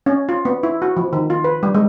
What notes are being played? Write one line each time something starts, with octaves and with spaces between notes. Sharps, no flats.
C#4
F4
B3
E4
F#4
F3
D#3
F4
B4
G3
G#3